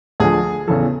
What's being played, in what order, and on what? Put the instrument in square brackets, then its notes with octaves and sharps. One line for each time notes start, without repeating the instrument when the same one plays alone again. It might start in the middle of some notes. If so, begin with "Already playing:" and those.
[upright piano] D2 D3 F3 G#4
E2 C#3 E3 A4